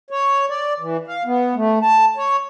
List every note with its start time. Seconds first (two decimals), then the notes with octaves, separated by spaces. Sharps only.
0.10 C#5
0.50 D5
0.80 E3
1.07 F5
1.25 B3
1.55 A3
1.82 A5
2.17 C#5